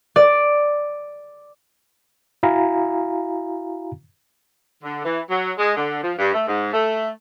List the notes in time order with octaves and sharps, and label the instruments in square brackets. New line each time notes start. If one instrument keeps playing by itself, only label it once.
[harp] D5
[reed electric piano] E4 F#4 F5 G#5 A#5 B5
[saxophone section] D3
E3
F#3
G#3
D3
F3
G2
A3
G#2
A3